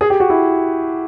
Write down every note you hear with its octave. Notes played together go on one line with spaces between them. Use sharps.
G#4
G4
F#4
E4